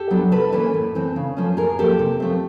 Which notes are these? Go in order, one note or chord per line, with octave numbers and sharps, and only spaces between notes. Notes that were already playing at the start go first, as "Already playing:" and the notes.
Already playing: G4 A4
F#3 B3 D4
C3 A4 B4
E3 G3 A#3 C#4 A4 B4
A2
E3 A3 C4
C#3
F3 A3 C#4
A2 G#4 A#4
F3 A#3 C#4 G4 A4
C3
F3 A3 C4